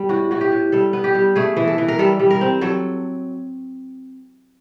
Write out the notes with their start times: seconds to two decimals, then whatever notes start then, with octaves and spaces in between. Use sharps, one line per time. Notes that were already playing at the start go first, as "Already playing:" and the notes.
Already playing: G3 B3
0.09 A2 F#4
0.31 A2 F#4
0.41 G4
0.52 A2
0.72 G3 A4
0.93 B3
1.04 G4
1.15 G3
1.36 A3 G#4
1.57 E3
1.67 A4
1.78 E3
1.88 A#4
1.99 G3 A4
2.19 G3
2.31 A#4
2.41 C4
2.61 F#3 A4